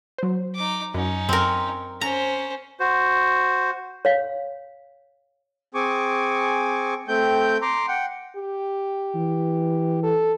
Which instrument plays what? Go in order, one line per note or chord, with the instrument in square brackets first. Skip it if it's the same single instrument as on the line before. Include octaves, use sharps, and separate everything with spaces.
[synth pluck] F#3 C5
[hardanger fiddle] D#4 D6
[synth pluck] F#2 [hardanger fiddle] C#4 D#4
[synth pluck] F#2 [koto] C4 A#4
[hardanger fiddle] C#4 C5 [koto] A#5
[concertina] F#4 C5
[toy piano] C#5 F5
[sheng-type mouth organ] C4 G#4 G#5 C#6 D6
A3 C4 G5 G6
A#5 C6 D6
F#5 G5
[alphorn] G4
[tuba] E3
[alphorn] A4